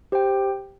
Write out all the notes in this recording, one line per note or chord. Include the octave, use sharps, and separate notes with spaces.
G4 C5 G5